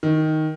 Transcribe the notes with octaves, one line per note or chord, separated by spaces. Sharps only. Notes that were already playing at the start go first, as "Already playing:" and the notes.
D#3